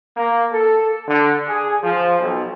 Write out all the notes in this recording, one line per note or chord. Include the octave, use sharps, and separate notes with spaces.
A#3
A4
D3
G#4
F3
B1